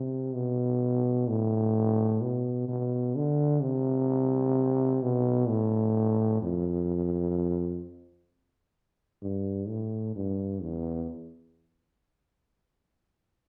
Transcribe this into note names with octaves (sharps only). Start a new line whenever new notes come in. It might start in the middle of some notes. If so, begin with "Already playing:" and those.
Already playing: C3
B2
A2
B2
B2
D3
C3
B2
A2
F2
G2
A2
G2
E2